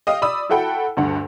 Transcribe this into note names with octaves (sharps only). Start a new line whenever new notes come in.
D#5 F5 G5 D#6
D5 B5 D#6 E6
E4 F#4 A4 F#5 G5 B5
D2 G2 F#5